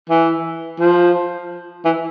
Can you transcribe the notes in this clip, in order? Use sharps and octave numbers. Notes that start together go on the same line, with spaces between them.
E3
F3
E3